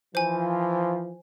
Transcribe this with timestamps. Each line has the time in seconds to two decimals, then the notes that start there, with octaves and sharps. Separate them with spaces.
0.15 E3 F3 C5 G#5